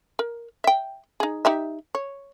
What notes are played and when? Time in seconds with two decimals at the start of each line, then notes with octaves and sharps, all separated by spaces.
0.19 A#4
0.64 E5 G5
1.20 D#4 G#4
1.45 D#4 G4 E5
1.95 C#5